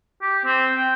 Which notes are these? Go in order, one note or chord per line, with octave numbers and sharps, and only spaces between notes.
G4
C4
G5